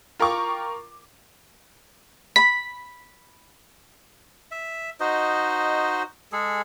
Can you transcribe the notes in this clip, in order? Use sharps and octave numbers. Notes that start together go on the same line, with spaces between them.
F4 A#4 G5 C#6 D6
B5 B6
E5
D#4 F#4 C5 D#5
G#3 G#4 A4